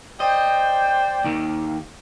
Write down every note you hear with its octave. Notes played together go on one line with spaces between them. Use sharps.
C5 D5 D#5 G5
D#2 D#3